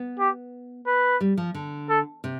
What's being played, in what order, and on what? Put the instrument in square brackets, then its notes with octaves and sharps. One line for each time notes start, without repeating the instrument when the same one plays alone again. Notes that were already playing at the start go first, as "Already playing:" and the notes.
Already playing: [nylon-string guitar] B3
[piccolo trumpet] G4
B4
[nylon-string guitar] G3
F3
D3
[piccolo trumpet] A4
[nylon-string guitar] C3